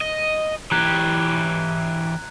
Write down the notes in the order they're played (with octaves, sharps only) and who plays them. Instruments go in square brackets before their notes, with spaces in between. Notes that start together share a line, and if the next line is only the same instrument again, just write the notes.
[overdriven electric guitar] D#5
[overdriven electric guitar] E3 G4 [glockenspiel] A#5 F#6 G#6